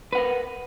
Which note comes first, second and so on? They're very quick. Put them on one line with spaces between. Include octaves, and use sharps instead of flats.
B4 F#5 A#4